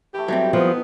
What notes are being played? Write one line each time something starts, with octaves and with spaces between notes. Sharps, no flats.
E3 A3 G4
B2 F#3 G3 C4
F3 B3 D#4 G#4